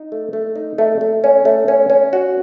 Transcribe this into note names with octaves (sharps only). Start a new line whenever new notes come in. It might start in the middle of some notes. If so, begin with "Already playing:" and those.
Already playing: D#4
A3
A3
D#4
A3
A3
C#4
A3
C#4
C#4
F#4